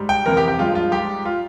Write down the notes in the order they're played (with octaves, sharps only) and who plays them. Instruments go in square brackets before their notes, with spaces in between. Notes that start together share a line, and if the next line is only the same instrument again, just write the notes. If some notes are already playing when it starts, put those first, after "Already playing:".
Already playing: [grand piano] G#2 G3
G5
F2 C3 E3 A#4
G4
G4
G2 F3 G#3 F4
F4
G#2 G3 G4
G3 F4